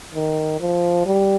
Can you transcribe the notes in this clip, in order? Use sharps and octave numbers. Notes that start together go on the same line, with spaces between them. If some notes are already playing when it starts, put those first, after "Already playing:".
D#3
F3
G3